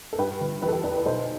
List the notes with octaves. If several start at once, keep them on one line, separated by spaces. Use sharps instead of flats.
A4
G2 G4 B4
G1
E3 G4 B4
A4
G4 B4
E2 B4 D5
B4 D5
B1 A4 C5